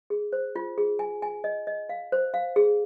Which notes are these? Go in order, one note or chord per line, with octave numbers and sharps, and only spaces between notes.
G#4
C5
F4
G#4
G#5
G#5
D#5
D#5
F5
C5
F5
G#4